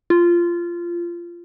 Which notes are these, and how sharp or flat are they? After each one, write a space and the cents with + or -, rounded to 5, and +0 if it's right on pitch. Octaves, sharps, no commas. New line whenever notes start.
F4 -15